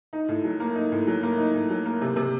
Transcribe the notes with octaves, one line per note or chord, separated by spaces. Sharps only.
D#4
A2
F#3
A#3
D#4
A2
F#3
A#3
D#4
A2
F#3
A#3
C3
C3